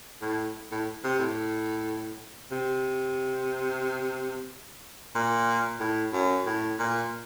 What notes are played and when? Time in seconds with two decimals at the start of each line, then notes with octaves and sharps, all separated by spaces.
0.21 A2
0.71 A2
1.04 C3
1.19 A2
2.51 C3
5.15 A#2
5.80 A2
6.13 F#2
6.46 A2
6.79 A#2